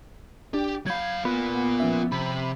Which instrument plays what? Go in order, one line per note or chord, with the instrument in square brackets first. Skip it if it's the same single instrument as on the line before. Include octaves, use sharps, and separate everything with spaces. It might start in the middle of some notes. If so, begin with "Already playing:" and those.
[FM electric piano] D4 [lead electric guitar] G4
[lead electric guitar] F#3 F5 [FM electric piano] B5 G6 G#6
[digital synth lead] B3 [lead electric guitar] F4 A#4 [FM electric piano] B5
[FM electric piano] F3 C#4 E5
[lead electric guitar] C3 [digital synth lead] B5